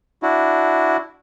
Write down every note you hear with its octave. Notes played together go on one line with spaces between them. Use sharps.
D4 E4 F#4